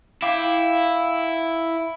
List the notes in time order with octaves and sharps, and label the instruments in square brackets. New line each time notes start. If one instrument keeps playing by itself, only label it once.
[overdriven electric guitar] E4 [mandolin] F5 G5 D6